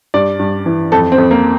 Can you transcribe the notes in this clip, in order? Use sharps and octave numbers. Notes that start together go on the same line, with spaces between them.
G2 D5
G2
E3
F2 A4
C4
F2
A#3